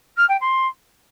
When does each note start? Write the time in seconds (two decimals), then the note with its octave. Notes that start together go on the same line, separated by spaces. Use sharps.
0.17 F6
0.28 G5
0.40 C6